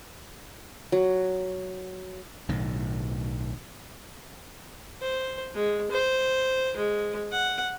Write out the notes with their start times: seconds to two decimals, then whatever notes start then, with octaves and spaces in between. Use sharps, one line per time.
0.92 F#3
2.49 B1 A2 D#3
5.02 C5
5.55 G#3
5.91 C5
6.77 G#3
7.32 F#5